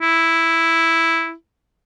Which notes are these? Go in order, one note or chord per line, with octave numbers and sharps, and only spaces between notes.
E4